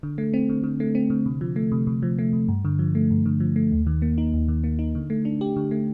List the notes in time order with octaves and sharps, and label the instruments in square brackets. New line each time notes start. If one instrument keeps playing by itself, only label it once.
[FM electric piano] D3
A3
C4
D3
D3
A3
C4
D3
C3
F3
A3
C3
C3
F3
A3
C3
G2
D3
F3
A3
G2
D3
F3
A3
D#2
D#3
A#3
D#4
D#2
D#3
A#3
D#4
D3
A3
D4
G4
D3
A3